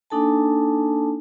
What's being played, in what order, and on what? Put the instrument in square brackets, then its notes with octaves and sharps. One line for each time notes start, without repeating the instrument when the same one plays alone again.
[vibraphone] A#3 D4 D#4 A4 G#5 A5